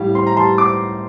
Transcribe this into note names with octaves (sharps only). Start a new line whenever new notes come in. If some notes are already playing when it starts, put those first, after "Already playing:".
Already playing: A2 G3 F5
C4 C6
A#5
G3 A5 C6
C4 D6